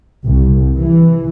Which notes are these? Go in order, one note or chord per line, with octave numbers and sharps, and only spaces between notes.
C2
E3